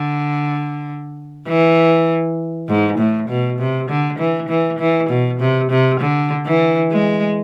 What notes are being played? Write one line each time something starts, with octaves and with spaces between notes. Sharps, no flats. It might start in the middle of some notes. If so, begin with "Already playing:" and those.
Already playing: D3
E3
G#2
A2
B2
C3
D3
E3
E3
E3
B2
C3
C3
D3
E3
G#3